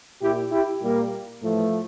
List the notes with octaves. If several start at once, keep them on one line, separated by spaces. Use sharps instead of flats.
A#2 E4 G4
E4 G4
A#2 G3 A#3
A2 E3 F3 A3